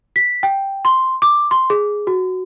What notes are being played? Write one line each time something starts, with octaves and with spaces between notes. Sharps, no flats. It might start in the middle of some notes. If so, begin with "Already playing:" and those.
B6
G5
C6
D6
C6
G#4
F#4